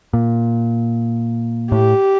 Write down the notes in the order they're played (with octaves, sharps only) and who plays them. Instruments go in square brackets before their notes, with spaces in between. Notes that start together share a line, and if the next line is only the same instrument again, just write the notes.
[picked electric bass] A#2
[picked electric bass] A2 [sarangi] G4